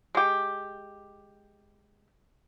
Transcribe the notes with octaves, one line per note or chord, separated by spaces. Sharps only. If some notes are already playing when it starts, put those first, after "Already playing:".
G#3 G4